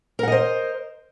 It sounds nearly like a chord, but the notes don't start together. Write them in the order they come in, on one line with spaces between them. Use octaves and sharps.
A#4 F#5 D#5 C5